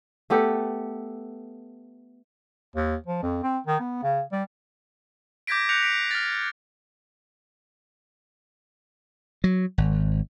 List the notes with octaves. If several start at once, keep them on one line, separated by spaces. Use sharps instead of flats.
A3 B3 G4 A4
D#2
F3
F2
C4
D#3
B3
C#3
G3
D6 G6 G#6 A#6 B6 D7
F#6 G6 A#6 C#7 F7
B6 C7 D7
F6 A6
F#3
G#1